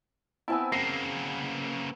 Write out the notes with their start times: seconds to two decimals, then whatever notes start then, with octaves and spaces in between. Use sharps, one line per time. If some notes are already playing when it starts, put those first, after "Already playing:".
0.48 B3 C4 E4 G#5 A5
0.72 C#3 A#3 A#6 C7